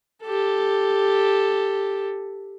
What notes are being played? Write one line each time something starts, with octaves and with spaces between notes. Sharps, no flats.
G4 A4